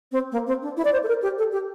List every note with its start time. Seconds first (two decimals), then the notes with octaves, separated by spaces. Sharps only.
0.12 C4
0.32 A#3
0.47 C4
0.62 D4
0.77 E4
0.85 D5
0.93 C5
1.03 A4
1.08 A#4
1.23 G4
1.38 A4
1.52 G4